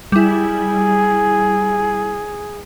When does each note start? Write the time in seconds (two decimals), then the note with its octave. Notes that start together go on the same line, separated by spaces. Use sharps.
0.12 G3 E4 G#4